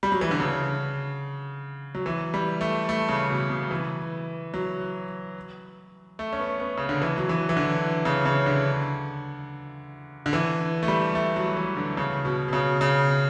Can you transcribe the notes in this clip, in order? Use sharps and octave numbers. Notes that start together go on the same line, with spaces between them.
G3
F#3
E3
D3
C#3
F#3
E3
G3
A3
A3
C#3
B2
C#3
F#3
E3
F#3
A3
C#4
B3
B3
C#3
D3
E3
F#3
E3
E3
D3
C#3
C#3
D3
D3
E3
A3
G3
A3
F#3
E3
D3
C#3
B2
B2
C#3
C#3